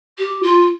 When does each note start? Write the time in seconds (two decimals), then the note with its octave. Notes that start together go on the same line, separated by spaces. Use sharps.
0.18 G4
0.42 F4